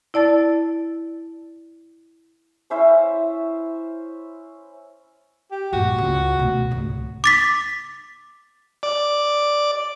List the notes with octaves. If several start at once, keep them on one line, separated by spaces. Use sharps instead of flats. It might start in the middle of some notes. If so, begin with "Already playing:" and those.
E4 D5 A5 A6
C#4 E4 C5 E5
G4
A#1 G2 F#4
C#2
B2 A3
G#1 C#2
D6 A6 B6
D5